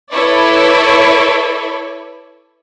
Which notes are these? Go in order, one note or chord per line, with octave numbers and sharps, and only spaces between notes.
E4 A4 B4 C#5 D5